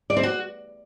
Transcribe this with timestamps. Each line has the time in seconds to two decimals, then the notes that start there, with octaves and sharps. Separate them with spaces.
0.10 D5
0.17 C4
0.23 F#4